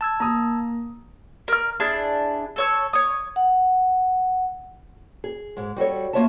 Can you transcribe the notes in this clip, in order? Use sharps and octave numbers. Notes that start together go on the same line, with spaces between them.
A5 E6 G#6
A#3 A#5 D#6
A#4 F6
D4 E4 G#4
A4 C#5 E6
C#5 D#6
F#5
G#4
G#2 G#3
G3 F#4 A4 C#5
A3 A#3 F4 C#5 E5 A5